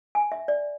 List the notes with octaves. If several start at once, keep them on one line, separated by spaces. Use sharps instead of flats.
G#5
E5
D5